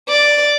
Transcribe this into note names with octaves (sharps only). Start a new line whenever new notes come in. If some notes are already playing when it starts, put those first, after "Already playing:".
D5